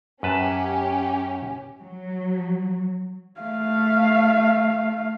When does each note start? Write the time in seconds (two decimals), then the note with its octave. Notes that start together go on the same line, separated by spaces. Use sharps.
0.23 F#2 C#4 G4 B4 A5
1.81 F#3
3.41 A3 F5